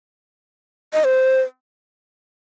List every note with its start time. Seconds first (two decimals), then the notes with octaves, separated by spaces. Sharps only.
0.93 D#5
1.04 C5